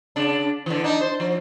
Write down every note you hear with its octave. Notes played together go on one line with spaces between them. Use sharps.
C#3 D4
D3 E3
D4 D#4
C5
F3